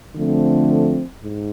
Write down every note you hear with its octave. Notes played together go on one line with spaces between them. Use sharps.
D3 F3 A3 C4
G#2